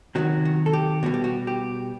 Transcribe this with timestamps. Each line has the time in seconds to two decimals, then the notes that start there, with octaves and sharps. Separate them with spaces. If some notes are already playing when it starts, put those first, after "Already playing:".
0.15 C3 D#3 F#3 F#4
0.45 F#4
0.66 A4
0.73 G4
1.03 B2 G3 F#4
1.14 G4
1.24 F#4
1.47 G4